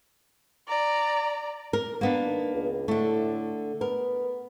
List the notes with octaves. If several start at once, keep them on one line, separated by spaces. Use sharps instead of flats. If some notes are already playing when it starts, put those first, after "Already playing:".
D5 A#5
A#4
A#3 B3 D4
D#3
C#2
A2 D3 A3
B3 A#4